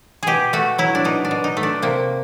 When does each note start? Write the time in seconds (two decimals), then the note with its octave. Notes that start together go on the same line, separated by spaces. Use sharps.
0.23 B2 G4 G#4
0.53 A3 F#4
0.78 F#3 E4
0.95 D4
1.05 B2 D#4
1.25 D4
1.31 B2
1.44 D#4
1.57 A3
1.63 D4
1.82 C3 A#3